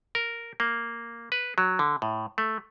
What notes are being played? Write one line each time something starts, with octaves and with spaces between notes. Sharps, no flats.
A#4
A#3
B4
F#3
D3
A2
A3